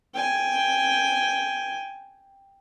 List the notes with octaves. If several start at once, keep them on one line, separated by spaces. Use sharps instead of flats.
G5 G#5